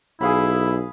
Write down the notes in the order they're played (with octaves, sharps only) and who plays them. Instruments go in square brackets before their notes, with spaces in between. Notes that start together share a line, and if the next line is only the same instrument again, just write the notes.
[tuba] B1 [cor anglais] E4 [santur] G#4 F5 B5